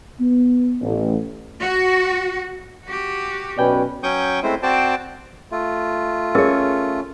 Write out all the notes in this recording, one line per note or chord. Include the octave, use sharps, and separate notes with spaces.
B3
A1
F#4
F#4 G4
B1 B2 C#4 B4 D5 G5 G#5
F#3 C#4 G5 C#6 D#6 G6
G#3 A3 C4 E4 C5
C4 F#4 C5 D5 G5 A5
A3 F4
C#4 G#4 A#4 C#5 D#5